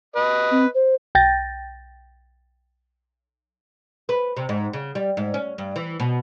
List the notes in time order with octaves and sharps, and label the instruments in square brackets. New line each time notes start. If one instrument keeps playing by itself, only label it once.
[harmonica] B4 D#5
[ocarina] C4
C5
[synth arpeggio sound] B1 G5 G6 A6 A#6
[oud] B4
C3
G#2
C#3
G3
G#2
C#4
G2
E3
B2